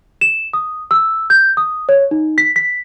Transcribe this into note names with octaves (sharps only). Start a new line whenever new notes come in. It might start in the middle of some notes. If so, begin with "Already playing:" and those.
E7
D#6
E6
G6
D#6
C#5
D#4
B6
B6